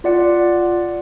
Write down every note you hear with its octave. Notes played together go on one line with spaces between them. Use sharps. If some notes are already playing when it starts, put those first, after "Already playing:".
F4 D5 F#5